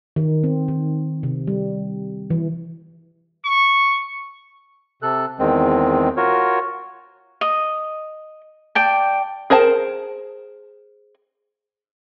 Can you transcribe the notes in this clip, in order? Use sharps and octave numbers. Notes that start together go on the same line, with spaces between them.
D#3
C4
D#3
C3
G3
E3
C#6
C3 A4 F#6
E2 D#3 G#3 C4
F4 F#4 A#4 C#5
D#5
D5 G5 A5
G#4 A#4 C5 A5